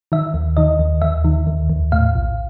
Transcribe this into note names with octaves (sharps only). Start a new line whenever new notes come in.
D#3 E5
D#2
D#3 D#5
D#2
D#2 E5
D#3
D#2
D#2
A2 F5
A#1